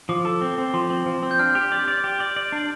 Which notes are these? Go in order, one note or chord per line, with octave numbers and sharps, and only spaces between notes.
F3 D6
A4
C4
C4
F3 C6
C4
F3
C4
G6
D4 F6
G4
D5
D5
G4
D5
D5
D4